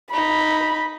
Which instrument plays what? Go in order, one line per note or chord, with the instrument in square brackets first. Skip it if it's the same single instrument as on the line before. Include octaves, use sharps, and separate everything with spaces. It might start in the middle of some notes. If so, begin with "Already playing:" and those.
[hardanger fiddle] D#4 [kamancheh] B5